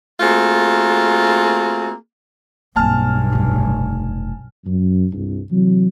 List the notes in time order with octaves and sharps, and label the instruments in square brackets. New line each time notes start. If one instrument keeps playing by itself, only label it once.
[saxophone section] A3 A#3 C4 F4 F#4 G#4
[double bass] B1 G2 [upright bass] A#3 C4 [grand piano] G#5 A5 F6
[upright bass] F1 D3
[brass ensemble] F#2
C2 G2
C3 E3 F#3